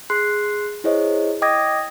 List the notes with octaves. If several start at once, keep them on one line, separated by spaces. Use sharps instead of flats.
G#4 C6 F#6 C7
E4 G#4 C5 C#5 D#5
D#5 G5 D6 D#6 G#6 A#6